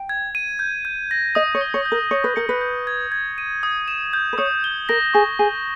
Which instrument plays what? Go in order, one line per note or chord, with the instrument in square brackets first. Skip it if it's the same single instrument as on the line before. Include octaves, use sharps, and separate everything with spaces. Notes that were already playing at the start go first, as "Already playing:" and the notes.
Already playing: [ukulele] G5
[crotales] G#6
D#7
G6
G6
A#6
[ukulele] D#5 [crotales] D#6
[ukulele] C#5
[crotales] G7
[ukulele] C#5
[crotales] G6
[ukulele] A#4
[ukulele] C#5 [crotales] C#6
[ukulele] B4
[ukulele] A#4 [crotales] C#7
[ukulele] B4
[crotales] G6
G#6
G#6
D#7
D#6
E7
G6
[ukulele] B4
[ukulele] C#5 [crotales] D#6
[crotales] G7
[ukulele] A#4 [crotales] A#6
[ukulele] G#4 [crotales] C#6
[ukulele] G#4 [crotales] D#7